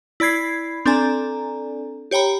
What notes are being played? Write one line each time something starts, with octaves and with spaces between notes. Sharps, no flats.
E4 D5 B5 G#6 C7
C4 D4 A4 D5 G#5 A#5
G4 C#5 G5 A#5 B5